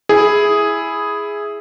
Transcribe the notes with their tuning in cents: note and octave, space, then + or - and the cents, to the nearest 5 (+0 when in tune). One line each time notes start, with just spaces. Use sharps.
E4 +0 G#4 +0